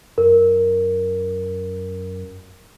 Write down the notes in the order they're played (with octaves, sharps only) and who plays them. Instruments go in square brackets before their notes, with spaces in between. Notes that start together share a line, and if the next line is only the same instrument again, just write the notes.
[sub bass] F#2 [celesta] A#4